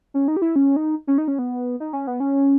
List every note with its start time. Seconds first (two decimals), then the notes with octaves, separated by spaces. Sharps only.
0.14 C#4
0.28 D#4
0.37 G4
0.42 E4
0.56 C#4
0.76 D#4
1.07 C#4
1.18 D#4
1.28 C#4
1.39 B3
1.80 D#4
1.93 C#4
2.07 B3
2.20 C#4